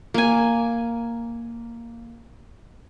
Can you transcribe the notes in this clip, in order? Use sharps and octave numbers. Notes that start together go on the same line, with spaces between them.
A#3 G#5